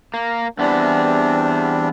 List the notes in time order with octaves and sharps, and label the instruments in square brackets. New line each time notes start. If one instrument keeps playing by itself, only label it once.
[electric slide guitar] A#3
[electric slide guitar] E2 B3 [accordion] G3 C4 D4